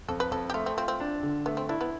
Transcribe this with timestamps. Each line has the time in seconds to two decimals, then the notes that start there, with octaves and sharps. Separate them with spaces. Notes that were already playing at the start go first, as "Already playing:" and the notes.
0.08 F2 A4
0.20 B4
0.31 F2 A4
0.50 G4
0.54 A3 F4
0.66 C4
0.77 C4 F4
0.88 C4
1.00 D4
1.23 D3
1.46 A3 B3
1.57 C4
1.69 D4 E4
1.81 B3